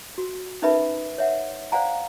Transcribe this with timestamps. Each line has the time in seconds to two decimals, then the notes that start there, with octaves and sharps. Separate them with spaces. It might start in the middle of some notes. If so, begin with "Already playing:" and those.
0.18 F#4
0.62 C#4 D#4 A#4 B4 E5 B5
1.18 C#5 E5 F#5
1.72 C5 D5 F5 F#5 G#5 A#5